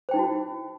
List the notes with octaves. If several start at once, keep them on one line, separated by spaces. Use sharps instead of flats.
D#4 E4 F#4 C5 G5